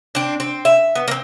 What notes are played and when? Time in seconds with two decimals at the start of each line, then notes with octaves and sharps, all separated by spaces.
0.15 C4 D4
0.40 C4
0.65 E5
0.95 B3
1.08 A#3 C4